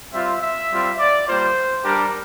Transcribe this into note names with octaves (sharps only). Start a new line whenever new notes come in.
G3 C4 F4 E5
E5
G3 C4 F4
D5
G3 A#3 F4 C5
G3 D4 G4 A#4